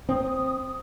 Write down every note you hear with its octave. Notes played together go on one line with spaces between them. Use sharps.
C4 D#6